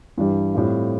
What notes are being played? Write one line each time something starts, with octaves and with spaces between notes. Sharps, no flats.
G2 E3 G3
A2 G3 C4 F4